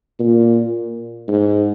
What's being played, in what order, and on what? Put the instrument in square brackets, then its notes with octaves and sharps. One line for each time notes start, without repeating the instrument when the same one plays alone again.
[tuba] A#2
G#2